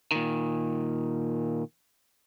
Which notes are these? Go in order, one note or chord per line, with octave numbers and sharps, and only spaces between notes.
A#2 D#3